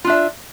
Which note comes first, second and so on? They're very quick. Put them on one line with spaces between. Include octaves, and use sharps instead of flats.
F4 D4 E5